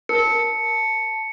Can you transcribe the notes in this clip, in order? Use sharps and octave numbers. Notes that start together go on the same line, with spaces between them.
A#4 A5 C#7